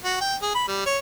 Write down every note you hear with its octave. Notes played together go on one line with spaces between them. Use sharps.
F#4
G5
G#4
B5
G3
C#5